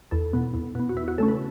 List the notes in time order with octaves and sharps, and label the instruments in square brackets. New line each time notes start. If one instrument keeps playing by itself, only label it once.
[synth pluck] E2 A4
B2 B3
E2
B2 B3
F#4
E2 E4
F#4
C#3 A3 C#4 A4
B4